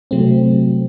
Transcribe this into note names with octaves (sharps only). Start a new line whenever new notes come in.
C3 F#3 A3 C4